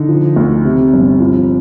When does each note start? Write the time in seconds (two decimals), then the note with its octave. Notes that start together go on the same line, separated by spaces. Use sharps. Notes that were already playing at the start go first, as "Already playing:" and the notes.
Already playing: D3 D#4
0.09 F3
0.36 D2
0.65 C3
0.93 G1
1.20 F3